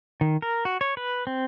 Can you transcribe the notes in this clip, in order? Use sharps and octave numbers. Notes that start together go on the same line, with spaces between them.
D#3
A#4
F#4
C#5
B4
C4